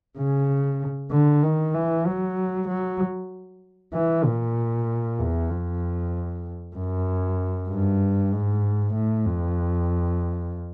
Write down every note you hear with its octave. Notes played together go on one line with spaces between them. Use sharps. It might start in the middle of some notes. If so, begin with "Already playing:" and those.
C#3
D3
D#3
E3
F#3
F#3
E3
A#2
E2
F2
F#2
G2
G#2
A2
F2